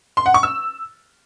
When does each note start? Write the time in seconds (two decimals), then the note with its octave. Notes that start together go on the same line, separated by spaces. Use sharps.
0.17 C6
0.26 F#5
0.34 C#6
0.43 E6